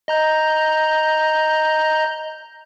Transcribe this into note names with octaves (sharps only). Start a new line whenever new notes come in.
D#5 A#5 G6